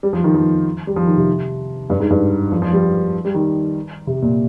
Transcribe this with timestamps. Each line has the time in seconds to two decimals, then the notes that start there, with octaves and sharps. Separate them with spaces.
0.03 G3
0.13 F3
0.24 D#3
0.34 F3
0.87 G3
0.96 F3
1.07 D#3
1.17 C3
1.90 G2
2.00 G#2
2.10 G2
2.52 F3
2.62 F3
2.73 G3
3.25 G3
3.35 D#3
4.07 C3
4.22 A#2